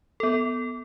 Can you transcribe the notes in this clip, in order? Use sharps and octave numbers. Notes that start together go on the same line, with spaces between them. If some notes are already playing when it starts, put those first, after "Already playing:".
B3 A4